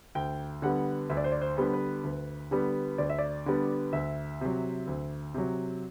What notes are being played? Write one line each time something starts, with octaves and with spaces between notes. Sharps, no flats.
D2 G5
D3 G3 B3 F#5
D2 E5
D5
C5
D5
C5
D3 G3 B3
B4
D2
D3 G3 B3
D2 D5
E5
D5
D3 G3 B3
D2 E5
C3 F#3
D2
C3 F#3